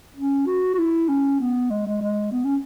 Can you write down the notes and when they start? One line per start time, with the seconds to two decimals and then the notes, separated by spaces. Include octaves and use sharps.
0.16 C#4
0.46 F#4
0.74 F#4
0.78 E4
1.08 C#4
1.40 B3
1.70 G#3
1.87 G#3
2.01 G#3
2.32 B3
2.44 C#4